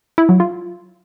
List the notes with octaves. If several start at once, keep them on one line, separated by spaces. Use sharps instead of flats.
E4
F#3
F4